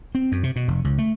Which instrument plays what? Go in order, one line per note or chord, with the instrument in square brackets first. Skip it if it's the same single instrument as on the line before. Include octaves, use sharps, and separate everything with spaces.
[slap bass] C4
F#2
C3
B2
F1
C#2
A3